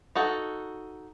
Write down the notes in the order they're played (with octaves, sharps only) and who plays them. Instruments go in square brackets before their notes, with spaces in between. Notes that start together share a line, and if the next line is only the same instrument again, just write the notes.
[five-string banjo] D#4 F#4 A4